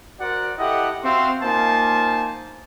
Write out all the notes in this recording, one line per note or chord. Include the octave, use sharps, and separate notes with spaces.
F#4 A#4 C5 D5 F#5
E4 G4 A4 D#5 F#5
C4 F#4 C5 E5 F5 C6
A#3 D#4 F4 C5 G#5 A5